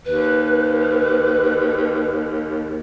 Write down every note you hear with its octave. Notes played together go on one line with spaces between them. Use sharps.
D#2 B4